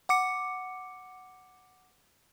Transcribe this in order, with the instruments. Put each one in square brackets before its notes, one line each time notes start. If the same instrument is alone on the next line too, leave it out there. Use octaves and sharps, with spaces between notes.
[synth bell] F#5 D6 C#7